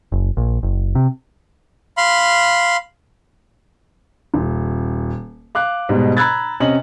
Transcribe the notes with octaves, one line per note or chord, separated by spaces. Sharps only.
F#1
A#1
F#1
C3
F5 B5 C6
D#1
F5 D6 F#6
G#2 B2 G3
A#5 B5 E6 F#6 G#6 A6
C3 C#4 D#5 F#7